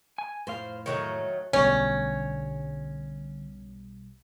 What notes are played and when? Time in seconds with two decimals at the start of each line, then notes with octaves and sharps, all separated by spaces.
0.18 G#5
0.47 F2 A2 C5 F5
0.86 D#3 F#3 A3
1.53 B1 B2 D3 G3 A3 C#4 D4 C#5